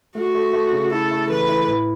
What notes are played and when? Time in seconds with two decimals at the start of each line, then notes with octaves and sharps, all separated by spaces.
0.15 A3 F#4
0.35 A3
0.54 A3
0.73 C#3
0.91 E4 A4
1.11 A3
1.29 E3 B4
1.49 E4
1.68 A2